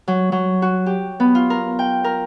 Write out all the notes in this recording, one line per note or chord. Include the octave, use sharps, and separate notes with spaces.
F#3
F#3
F#4
G4
B3
F4
A#4
G5
A#4